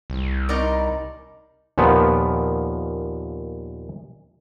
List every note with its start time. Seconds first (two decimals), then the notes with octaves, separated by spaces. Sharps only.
0.10 C2
0.49 D#4 A#4 D5
1.78 D#2 A#2 F3 B3